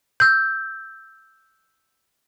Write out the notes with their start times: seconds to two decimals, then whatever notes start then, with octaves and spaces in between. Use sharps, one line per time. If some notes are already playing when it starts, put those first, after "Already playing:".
0.20 E6 G6